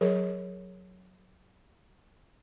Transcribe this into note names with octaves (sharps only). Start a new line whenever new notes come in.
F#3 G#4 A#4 C#5